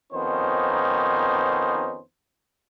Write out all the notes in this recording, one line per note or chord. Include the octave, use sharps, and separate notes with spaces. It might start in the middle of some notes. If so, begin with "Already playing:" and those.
F2 D#3 B3 C#4 D#4 C5